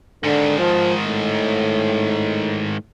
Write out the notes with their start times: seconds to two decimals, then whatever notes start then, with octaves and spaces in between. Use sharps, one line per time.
0.24 G#2 D3 D#3
0.59 F3
1.04 A2